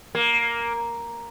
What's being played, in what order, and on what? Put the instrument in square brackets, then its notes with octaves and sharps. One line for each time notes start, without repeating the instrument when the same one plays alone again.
[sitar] A#3